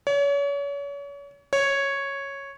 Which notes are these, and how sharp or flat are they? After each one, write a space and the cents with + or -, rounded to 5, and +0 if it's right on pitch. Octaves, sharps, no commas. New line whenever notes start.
C#5 +35
C#5 -5